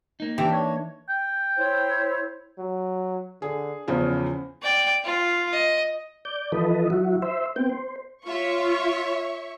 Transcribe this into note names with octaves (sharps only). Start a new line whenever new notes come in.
A#3 D#4
E3 D4 G4 E5 G5
C#5
G5
E4 C5 C#5
F#3
D3 G#4
E2 C#3 F3 C#4
D5 G5
F4
D#5
D5 G6
E3 F3 A4 B4 D#5
F#3 E4 F#4
C5 E5
B3 C4 G5
C5
F4 C#5 E5 C#6